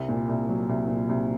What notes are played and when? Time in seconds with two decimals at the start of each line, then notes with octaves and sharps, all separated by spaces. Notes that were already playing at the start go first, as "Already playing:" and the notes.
Already playing: C2
0.09 A#2
0.29 C2
0.49 F#3
0.69 C2
0.88 A#2
1.09 C2